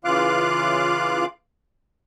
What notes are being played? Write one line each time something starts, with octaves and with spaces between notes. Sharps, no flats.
C#3 E3 F4 F5 D6 F#6